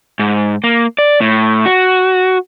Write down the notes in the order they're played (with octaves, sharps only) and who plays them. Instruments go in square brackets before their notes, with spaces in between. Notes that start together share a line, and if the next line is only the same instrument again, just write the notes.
[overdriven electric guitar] G#2
A#3
D5
A2
F#4